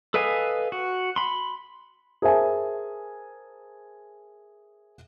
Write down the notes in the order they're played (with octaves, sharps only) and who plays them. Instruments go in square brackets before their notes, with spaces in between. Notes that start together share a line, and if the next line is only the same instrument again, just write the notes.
[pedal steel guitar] A4 B4 D#5 F5 G#5
F#4
B5 C6
[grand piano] G#4 A#4 C5 E5 G#5 A5